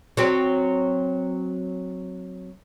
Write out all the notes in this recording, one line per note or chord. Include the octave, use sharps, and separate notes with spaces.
F#3 C4